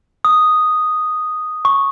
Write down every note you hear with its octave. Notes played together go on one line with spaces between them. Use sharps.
D#6
C#6